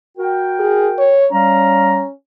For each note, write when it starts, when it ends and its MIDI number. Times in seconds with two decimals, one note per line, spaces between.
0.18 1.14 66
0.18 1.14 70
0.18 1.14 79
0.59 0.87 68
0.98 1.26 73
1.32 2.03 55
1.32 2.11 61
1.32 2.03 77
1.32 2.03 82